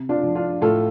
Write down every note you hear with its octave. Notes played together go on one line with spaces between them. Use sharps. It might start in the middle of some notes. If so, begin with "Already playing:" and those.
Already playing: C3
D4 F4
F3
D4 F4
A2 F4 A4